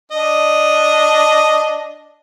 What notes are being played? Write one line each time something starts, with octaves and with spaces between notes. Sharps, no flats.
D4 D#5